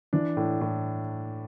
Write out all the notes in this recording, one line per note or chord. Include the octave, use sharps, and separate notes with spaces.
E3 D4
A2
A2